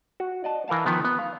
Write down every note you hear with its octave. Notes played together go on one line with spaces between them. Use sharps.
F#4
D5 D#5 A5
E3 A#4 F5 A5
D#3 F3 B3
B3
F5